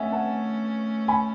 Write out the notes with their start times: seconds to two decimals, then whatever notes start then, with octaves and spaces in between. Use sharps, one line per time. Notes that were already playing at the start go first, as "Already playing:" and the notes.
Already playing: A3 C#4 D#5 E5 F#5 G#5
0.12 F#5 A5
1.08 G#5 B5